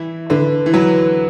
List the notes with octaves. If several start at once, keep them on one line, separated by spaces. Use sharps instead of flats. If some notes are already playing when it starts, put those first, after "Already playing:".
Already playing: E3 E4
D3 B4
E3
F#3 B4